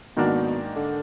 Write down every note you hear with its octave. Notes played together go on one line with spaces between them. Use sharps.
G#2 B2 D#3 A#3 D4 F#4
D3